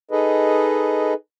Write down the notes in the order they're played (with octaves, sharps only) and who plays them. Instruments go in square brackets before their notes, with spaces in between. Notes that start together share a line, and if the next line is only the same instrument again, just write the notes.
[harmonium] D#4 G#4 A4 B4 D#5